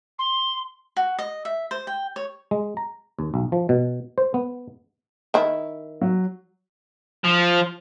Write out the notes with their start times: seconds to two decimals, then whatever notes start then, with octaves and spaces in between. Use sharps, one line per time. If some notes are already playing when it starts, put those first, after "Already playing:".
0.19 C6
0.96 F#4
1.19 D#5
1.45 E5
1.71 C5
1.87 G5
2.16 C#5
2.51 G#3
2.77 A#5
3.19 D#2
3.34 B1
3.52 F3
3.69 B2
4.18 C5
4.34 B3
5.34 D#3 E4
6.01 F#3
7.24 F3